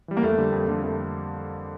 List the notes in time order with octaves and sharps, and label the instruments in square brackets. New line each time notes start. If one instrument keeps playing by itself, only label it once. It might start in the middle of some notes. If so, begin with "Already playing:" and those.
[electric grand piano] E3 G3
[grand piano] A#3
[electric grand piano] F2 [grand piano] A3
[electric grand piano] D3 G3 A#3
F2
D3 G3 A#3
[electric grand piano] F2 [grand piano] A3